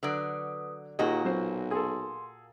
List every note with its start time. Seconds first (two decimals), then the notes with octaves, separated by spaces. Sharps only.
0.03 D3 F#3 B4 D5 D#6
0.99 D#2 A#2 A#3 F4 F#4 G#4 D#5
1.25 B1 F#3 C5
1.71 G#4 A4 C6